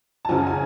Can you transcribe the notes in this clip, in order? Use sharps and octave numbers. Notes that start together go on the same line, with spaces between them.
A5
F#2 C#3 F#3 G#5
G#5